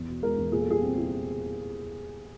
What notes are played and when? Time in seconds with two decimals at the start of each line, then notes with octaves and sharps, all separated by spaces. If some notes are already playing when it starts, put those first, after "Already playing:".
Already playing: E2
0.08 B2
0.22 G#3 A#4
0.38 E2
0.52 A#2 G#4
0.61 A4
0.67 G3 G#4
0.82 C4
0.97 E4